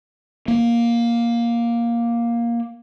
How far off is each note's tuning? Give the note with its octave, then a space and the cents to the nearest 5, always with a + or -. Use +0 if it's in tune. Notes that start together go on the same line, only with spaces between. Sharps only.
A#3 +10